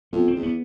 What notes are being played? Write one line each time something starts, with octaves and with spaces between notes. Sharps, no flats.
F2 B3
C4
E2
B3